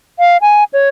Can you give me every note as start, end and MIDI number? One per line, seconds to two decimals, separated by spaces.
0.19 0.37 77
0.42 0.64 80
0.73 0.89 73